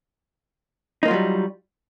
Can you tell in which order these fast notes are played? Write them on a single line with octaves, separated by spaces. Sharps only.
D#4 A#3 F4 F#3 G3